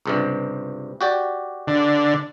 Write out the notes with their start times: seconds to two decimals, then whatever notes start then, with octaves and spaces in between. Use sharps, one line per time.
0.06 C#2 G2 C3
1.01 F#4 G4 D5
1.68 D3